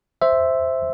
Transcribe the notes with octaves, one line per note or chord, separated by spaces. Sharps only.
C5 E5